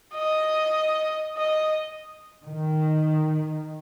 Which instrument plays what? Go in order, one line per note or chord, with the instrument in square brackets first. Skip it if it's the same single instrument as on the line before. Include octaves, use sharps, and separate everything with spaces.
[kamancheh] D#5
D#5
[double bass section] D#3